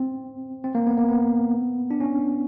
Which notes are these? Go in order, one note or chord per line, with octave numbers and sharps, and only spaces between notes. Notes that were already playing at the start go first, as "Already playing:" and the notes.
Already playing: C4
C4
A#3
B3
A#3
B3
D4
C#4